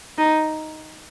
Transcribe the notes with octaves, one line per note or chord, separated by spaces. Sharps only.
D#4